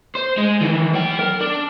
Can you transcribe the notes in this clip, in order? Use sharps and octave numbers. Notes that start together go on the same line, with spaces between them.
C5
G#3
D#3 E3
F#3 G5
A#4
D4